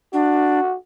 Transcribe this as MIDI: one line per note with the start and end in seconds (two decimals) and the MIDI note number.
0.13 0.60 62
0.13 0.76 66